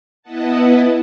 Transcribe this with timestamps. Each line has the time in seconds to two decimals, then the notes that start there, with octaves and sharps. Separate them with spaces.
0.22 B3 E4 B4 D#5 F#5 A5